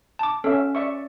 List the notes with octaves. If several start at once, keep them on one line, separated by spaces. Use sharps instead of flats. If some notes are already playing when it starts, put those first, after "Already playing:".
A5 D6
C#4 A4 E5
D5 E5 C#6